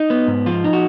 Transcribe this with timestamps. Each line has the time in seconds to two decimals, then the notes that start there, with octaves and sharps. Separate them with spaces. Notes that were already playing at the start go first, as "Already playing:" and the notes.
Already playing: D#4
0.10 B3
0.27 G#2
0.46 F3 F4
0.64 D#4
0.73 F#4